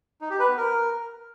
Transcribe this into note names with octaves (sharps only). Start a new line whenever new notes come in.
D#4
G4
B4
B3
A#4